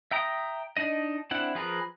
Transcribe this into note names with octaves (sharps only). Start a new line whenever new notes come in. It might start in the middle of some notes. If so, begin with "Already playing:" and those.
E5 G5 A#5 D#6
D4 D#4 D#5
C4 D4 E4 F#5
F3 G#4 A#4 B4